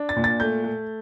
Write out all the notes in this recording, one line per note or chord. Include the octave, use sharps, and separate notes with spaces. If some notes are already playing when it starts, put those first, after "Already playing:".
Already playing: D4
A6
A#2
A6
A3 G6
A3